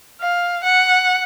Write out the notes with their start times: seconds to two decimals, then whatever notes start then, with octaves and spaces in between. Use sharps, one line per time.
0.21 F5
0.64 F#5